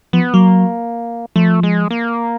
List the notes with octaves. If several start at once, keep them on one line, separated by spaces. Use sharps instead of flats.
F3 B3
F#3 A#3
F3 A3
G#3
A#3